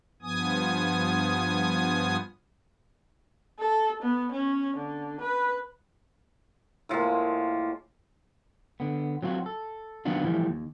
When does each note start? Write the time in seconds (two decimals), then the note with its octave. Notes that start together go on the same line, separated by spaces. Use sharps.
0.22 G2 F3 B3 G#5 D#6
3.59 A4
4.03 B3
4.32 C#4
4.77 D3
5.21 B4
6.89 A2 F3 G#3 A#3
8.80 D3 B3
9.22 F#3 C4 F4 F#4
9.46 A4
10.05 D#3 F#3 A#3 B3 D4 F4
10.24 E3 F3 G3 A3
10.48 D#2